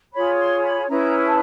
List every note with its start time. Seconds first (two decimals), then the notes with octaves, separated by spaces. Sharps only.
0.12 F4 G#4 C#5 B5
0.38 C6
0.63 B5
0.88 C#4 E4 G#4 B4 A#5
1.25 A5